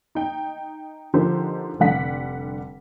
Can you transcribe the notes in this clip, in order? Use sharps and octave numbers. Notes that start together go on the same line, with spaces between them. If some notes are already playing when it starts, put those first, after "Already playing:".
D#4 G5
D3 F3 A#3 D#4 G4 C5
F1 D3 G3 F#5 B6